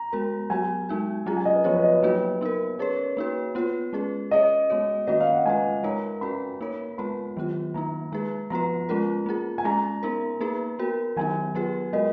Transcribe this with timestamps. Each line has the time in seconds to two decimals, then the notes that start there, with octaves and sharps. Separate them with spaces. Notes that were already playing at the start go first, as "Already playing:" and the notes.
Already playing: A#5
0.13 G#3 B3 F#4 A#4
0.50 F#3 B3 F#4 G#5
0.89 G#3 D#4 F#4
1.26 F#3 C#4 F4 G#4 A#5
1.37 G#5
1.45 D#5
1.55 B4
1.64 F3 B3 F4 G#4 C#5
1.74 B4
1.84 D#5
1.93 B4
2.03 F#3 A#3 D#4 F#4 C#5
2.41 B3 D#4 A#4
2.79 C#4 G#4 B4 C#5
3.17 A#3 D#4 F#4 B4
3.55 B3 F4 B4
3.93 G#3 C#4 G#4 B4
4.31 C#4 G#4 C#5 D#5
4.70 G#3 B3 F#4 C#5
5.07 D#3 A#3 C#4 F#4 B4 D#5
5.20 F5
5.33 F#5
5.46 G#3 C#4 F4 B4 G#5
5.83 G#3 D#4 A#4 C#5 A#5
6.21 C#4 F#4 B4 B5
6.61 A#3 D#4 A#4 C#5
6.98 G#3 B3 F4 B4 B5
7.37 D#3 F#3 B3 F4
7.74 D#3 A#3 D#4 A#5
8.12 G#3 D#4 G#4 B4
8.50 F3 B3 F4 B4 A#5
8.89 G#3 C#4 F4 A#4
9.26 A#3 F4 G#4
9.58 G#5
9.64 G#3 C#4 G#4 A#5
10.03 B3 D#4 A#4
10.41 A#3 D#4 G#4 B4
10.79 B3 F#4 A#4
11.16 D#3 F#3 B3 D#4 G#5
11.55 F#3 B3 F4 G#4 B4
11.93 G#3 B3 F#4 A#4 D#5